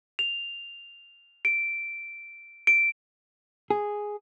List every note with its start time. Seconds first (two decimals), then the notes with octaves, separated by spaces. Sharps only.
0.19 F7
1.45 D7
2.67 D7
3.70 G#4